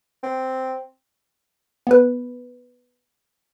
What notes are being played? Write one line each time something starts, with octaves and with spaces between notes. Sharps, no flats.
C4
B3 B4